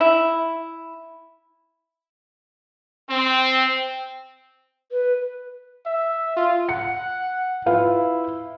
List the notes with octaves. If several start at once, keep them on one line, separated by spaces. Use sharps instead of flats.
E4
C4
B4
E5
F4
F#5 C#7
E4 F4 B4 F5